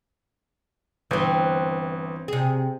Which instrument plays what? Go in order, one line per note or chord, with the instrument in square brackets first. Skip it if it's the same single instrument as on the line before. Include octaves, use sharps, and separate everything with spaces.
[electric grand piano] G1 [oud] E3 C4
[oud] C3 G#4